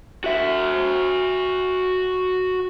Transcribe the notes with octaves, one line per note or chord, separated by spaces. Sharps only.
F#4 E5